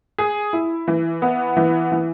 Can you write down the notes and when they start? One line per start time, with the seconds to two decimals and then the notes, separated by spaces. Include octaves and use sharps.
0.18 G#4
0.53 E4
0.88 E3
1.22 B3
1.57 E3
1.92 E3